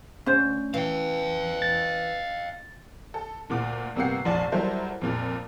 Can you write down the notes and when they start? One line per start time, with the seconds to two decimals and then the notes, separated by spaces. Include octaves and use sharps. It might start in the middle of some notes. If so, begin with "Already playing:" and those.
0.26 D2 C#4 C5
0.74 E3 F5 G5
1.62 A6
3.14 A4
3.50 D2 A#2 D6
3.96 G1 C3 A#3 G4 F#5 C7
4.25 F1 A#1 D5 A5
4.52 F#3 G3 E4 A4 A#4 C5
5.02 F2 A#2